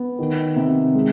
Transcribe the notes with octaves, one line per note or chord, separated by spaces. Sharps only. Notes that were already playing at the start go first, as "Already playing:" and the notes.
Already playing: B3
D#3
C3
G#3